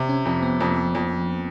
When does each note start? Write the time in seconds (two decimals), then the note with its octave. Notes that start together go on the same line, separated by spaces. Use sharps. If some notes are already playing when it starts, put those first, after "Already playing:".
Already playing: C3
0.09 C#4
0.25 F2 C4
0.42 B3
0.60 F2 A#3
0.95 F2